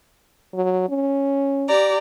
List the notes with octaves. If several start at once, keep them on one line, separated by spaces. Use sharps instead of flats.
F#3
C#4
G4 D5 A#5